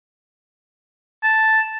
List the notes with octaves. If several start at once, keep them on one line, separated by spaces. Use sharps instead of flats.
A5